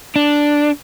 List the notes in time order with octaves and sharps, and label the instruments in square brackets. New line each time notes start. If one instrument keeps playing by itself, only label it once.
[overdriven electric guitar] D4